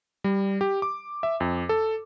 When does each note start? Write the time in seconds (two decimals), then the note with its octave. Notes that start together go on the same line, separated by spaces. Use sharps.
0.24 G3
0.61 G4
0.82 D6
1.23 E5
1.40 F2
1.69 A4